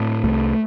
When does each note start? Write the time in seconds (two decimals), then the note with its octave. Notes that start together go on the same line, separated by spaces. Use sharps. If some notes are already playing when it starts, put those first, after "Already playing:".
Already playing: A2 C4
0.24 C2 A3